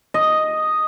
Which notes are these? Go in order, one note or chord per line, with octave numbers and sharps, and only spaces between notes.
D#5